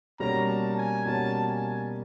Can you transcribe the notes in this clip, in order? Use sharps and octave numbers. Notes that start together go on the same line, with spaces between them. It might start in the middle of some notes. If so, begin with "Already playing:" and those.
B2 G3 A#3 C#4 A#5
A5
G#5
B2 G3 A#3 C#4 A5
G#5